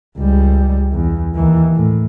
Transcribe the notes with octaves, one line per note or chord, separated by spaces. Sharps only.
C#2 G3
E2
D#2 E3
A2